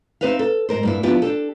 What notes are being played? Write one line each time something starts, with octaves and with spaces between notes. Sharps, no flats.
C4 D#4 G4 B4 E5 F5
A4
G#2 A#4 C5
G2 A#3 E4
F3 B3 D4 E4 G4
D4 G4 A4